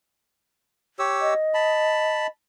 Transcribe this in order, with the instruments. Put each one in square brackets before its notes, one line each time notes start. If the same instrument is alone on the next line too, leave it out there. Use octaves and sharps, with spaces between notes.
[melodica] G4 C#5 E6
[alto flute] D#5
[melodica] A5 B5